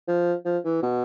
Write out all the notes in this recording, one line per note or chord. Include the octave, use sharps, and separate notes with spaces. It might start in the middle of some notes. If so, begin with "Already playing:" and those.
F3
F3
E3
B2